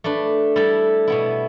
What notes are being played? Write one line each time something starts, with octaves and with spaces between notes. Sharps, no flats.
A3 D4 B4
G3 E4 A4
B2 B3 E4